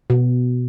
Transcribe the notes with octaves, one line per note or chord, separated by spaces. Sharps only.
B2